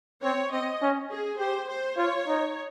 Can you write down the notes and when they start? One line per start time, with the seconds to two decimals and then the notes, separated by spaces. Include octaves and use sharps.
0.23 C4 C#5
0.52 C4 D#5
0.82 C#4
1.11 G#4
1.39 G4 C5
1.69 C5
1.97 F4 C#5
2.27 D#4